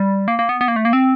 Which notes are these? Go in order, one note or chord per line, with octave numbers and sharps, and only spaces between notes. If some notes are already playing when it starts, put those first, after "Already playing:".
Already playing: G3
A#3
A#3
B3
B3
A#3
A3
A#3
C4